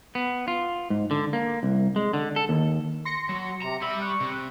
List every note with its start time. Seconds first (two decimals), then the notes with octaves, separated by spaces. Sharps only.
0.15 B3
0.48 F4
0.90 G#2
1.11 D3
1.33 A#3
1.63 C2
1.96 G#3
2.14 D3
2.36 A4
2.49 D#2
3.05 C6 A#6 C#7
3.29 F#3
3.62 C3 A#5
3.82 G3 E5 B5
4.02 C#6 F#6
4.20 C3